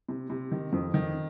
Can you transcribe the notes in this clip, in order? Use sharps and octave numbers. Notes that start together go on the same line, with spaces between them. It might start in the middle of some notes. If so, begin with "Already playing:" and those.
C3
C3
D#3
F2
D#3